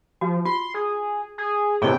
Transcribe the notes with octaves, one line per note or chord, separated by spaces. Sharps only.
F3 F#4
F4 C6
G#4
G#4
A2 C3 E3 G#4 D#5 G5